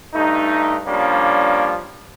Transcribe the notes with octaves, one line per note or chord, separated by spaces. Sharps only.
G2 A3 D#4
F3 G3 A#3 C#4 D4